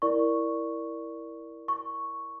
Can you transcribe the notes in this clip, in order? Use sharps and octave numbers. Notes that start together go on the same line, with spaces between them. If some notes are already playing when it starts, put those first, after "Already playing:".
E4 A#4 D5 C#6
C#6